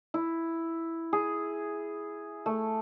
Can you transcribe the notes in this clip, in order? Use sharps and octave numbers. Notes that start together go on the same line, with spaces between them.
E4
G#4
A3